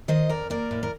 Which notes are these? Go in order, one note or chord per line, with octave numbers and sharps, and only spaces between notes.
D#3 C5 D#5
F2 A#4 D5
A#3 A#4 D5
A2
A#4